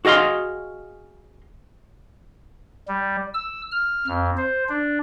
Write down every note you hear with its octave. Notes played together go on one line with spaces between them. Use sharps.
F#4 G#4 D#5 F5 C6
G3
E6
F6
F2
C5
D4